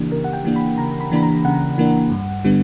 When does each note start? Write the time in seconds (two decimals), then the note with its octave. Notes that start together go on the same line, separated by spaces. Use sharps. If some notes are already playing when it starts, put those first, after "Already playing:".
Already playing: C#3 E3 A#3 D4 G4
0.11 C#3 A#4
0.24 F#5
0.33 G5
0.45 E3 A#3 D4
0.56 B5
0.78 C#3 A#5
1.01 B5
1.11 E3 A#3 D4 B5
1.23 A#5
1.45 C#3 F#5
1.78 E3 A#3 D4
2.12 G2
2.44 D3 G3 B3 D4